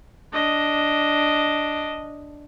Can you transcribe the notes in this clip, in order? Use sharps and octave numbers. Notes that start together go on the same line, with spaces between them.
D4 D#5